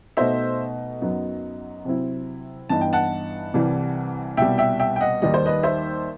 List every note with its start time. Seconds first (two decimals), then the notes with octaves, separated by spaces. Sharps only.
0.17 B2 A3 D#4 C5 E5
1.01 F#2 F#3 B3 D#4
1.85 C3 F#3 C4 E4
2.69 G2 E3 B3 D#4 A5
2.81 G5
2.93 F#5 A5
3.54 C2 C3 E3 G3
4.37 C2 B2 G3 E5 G5
4.58 E5 G5
4.80 E5 G5
4.96 G5
5.01 D#5 F#5
5.22 D#2 D#3 G3 D#4 D#5
5.34 C5
5.46 B4 D#5
5.63 C5 E5